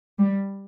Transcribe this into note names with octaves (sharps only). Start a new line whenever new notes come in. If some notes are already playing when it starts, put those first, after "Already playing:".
G3